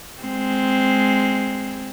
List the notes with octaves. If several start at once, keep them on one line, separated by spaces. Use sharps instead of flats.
G#3 C4